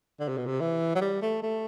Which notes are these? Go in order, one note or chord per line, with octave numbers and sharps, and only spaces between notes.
D3
C3
B2
C3
E3
F#3
G3
A3
A3